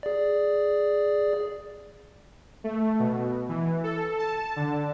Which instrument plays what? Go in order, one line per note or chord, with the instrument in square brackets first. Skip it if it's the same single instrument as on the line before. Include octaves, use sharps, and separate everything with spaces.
[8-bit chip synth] G#4 D5
[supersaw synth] A3
B2
E3
A4
A5
D3